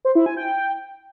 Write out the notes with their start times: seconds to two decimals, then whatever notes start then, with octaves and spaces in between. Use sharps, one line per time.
0.05 C5
0.15 E4
0.26 G#5
0.37 G5